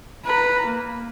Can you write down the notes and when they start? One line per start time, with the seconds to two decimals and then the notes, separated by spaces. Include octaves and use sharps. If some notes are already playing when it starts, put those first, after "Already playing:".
0.25 B4 A#5
0.65 A#3